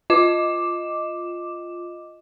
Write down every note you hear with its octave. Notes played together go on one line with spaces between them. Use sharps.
F4 D#5 D6 E7